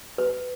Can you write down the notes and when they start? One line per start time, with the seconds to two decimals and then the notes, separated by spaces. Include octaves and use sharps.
0.18 B4